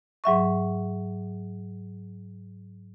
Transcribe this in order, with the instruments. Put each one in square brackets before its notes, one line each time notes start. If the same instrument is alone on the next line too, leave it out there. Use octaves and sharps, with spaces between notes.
[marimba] G#2 F#3 E5 C#6